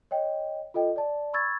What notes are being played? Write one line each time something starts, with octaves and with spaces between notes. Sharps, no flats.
C#5 D#5 G5
F4 A4 D#5 G5
D5 A5
B5 C#6 E6 G#6 A6